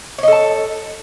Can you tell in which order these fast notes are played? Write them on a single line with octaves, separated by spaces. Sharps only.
C#5 D#5 A4 A5